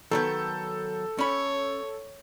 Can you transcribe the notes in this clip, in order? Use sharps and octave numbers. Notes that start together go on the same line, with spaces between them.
D#3 F#3 B3 A4 G6
C#4 C#5 B5